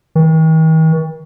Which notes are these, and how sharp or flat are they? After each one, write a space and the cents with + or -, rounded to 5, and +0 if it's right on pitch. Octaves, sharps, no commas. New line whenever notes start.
D#3 +45